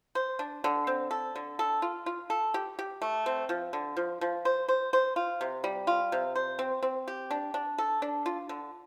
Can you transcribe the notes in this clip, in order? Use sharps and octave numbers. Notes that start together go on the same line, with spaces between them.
C5
D4
D3
C4
A4
D3
A4
F4
F4
A4
G4
G4
A3
C4
F3
D3
F3
F3
C5
C5
C5
F4
C3
G3
F4
C3
C5
C4
C4
G4
D4
D4
A4
D4
F4
D3